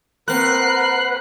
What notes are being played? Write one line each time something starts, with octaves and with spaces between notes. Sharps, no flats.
A#3 C4 A#4 B4 F#5 F#6 C7